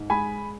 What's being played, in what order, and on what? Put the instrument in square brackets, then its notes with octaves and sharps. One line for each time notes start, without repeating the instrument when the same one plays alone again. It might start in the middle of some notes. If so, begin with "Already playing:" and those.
Already playing: [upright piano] G#2
G#3 G#5 B5